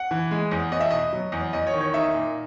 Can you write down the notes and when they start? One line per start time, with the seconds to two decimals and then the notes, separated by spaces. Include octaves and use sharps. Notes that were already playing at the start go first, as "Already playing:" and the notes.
Already playing: F#5
0.11 E3
0.31 G#3
0.51 E2
0.72 E2 D#5
0.80 E5
0.90 B2 D#5
1.13 F#3
1.32 E2
1.53 E2 D#5
1.67 C#5
1.74 D#3
1.81 C#5
1.93 D#4 E5
2.14 A#2